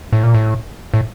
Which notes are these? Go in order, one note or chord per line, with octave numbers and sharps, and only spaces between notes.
A2
A#2
A2
A2